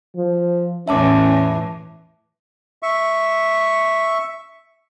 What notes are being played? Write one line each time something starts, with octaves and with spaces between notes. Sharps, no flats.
F3
E2 A2 E3 C#4 E5 A5 D6
E5 C#6